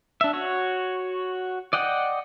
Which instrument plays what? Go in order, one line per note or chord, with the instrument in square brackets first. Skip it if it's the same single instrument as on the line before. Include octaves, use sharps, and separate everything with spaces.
[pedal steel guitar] D4 E5
F#4 C#5
D5 D#5 F#5 G5